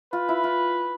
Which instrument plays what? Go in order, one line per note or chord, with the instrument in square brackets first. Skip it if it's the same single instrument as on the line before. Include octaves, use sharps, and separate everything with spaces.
[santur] F4 [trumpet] B4
[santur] E4
F4